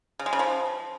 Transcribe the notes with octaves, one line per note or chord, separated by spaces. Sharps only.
C#3
G#3
C#3
F3